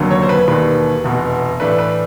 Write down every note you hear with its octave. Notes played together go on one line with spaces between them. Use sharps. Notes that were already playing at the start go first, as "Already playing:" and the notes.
Already playing: F1 D#2 D3 F#3
C#5
C5
B4
E1 D#2 D#3 G3 B4
F1 E2 B2
A2 E3 A3 D4 B4
B4